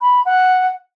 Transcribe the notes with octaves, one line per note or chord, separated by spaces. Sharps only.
B5
F#5